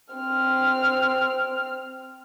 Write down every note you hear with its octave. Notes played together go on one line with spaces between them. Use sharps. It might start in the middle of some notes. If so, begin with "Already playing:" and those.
C4 F6